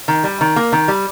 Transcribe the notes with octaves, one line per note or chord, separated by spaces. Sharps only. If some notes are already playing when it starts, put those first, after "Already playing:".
D#3
G3
D#3
A#3
D#3
G3